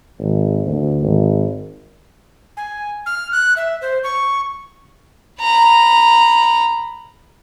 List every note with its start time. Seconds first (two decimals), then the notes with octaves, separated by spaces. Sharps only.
0.19 G#1
0.66 D2
1.02 G#1
2.57 G#5
3.06 F6
3.32 F#6
3.57 E5
3.82 C5
4.04 C#6
5.40 A#5 B5